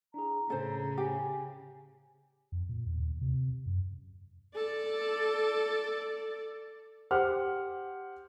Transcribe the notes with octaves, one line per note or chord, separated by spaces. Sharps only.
D4 E4 G#4 A#5
A2 C#3 C#4 A4 C5
G4 G#5
F2
A#2
E2
D#2
C3
F#2
A4 D5
G4 C5 F#5 F6